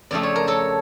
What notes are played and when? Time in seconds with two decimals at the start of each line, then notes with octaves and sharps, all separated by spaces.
0.11 F2 C#3 F3 A3 D5
0.23 C#5
0.36 A#4
0.47 A4 C#5